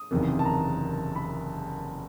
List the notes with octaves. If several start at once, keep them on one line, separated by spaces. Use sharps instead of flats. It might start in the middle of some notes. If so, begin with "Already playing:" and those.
Already playing: D#6
F#1 E2 C3 D#3
A5
A#5
B5